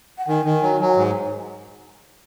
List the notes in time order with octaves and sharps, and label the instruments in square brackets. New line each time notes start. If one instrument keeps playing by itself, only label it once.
[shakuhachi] F#5
[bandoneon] D#3 [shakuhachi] G#5
[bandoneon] D#3
F#3
F#3
G#2